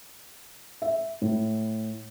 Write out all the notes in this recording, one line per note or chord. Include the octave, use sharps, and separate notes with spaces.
E5
A2